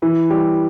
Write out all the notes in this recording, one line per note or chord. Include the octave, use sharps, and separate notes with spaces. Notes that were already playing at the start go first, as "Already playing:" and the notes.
E3 E4
G3 G4